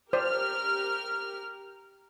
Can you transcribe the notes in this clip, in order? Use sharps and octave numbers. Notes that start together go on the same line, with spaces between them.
G4 A#4 C5 D5 F6